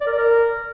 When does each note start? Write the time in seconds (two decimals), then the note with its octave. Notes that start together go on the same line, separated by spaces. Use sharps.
0.01 D5
0.07 A#4
0.12 D5
0.18 A#4